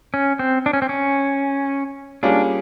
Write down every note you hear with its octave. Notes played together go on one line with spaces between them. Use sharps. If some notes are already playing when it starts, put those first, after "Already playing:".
C#4
C4
D4
C#4
C4
C#4
G3 A#3 C#4 D4 F4 G#4